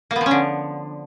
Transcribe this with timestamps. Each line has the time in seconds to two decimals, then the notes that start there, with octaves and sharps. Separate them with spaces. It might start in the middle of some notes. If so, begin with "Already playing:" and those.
0.11 A#3
0.16 B3
0.21 F3
0.26 C#4
0.31 D3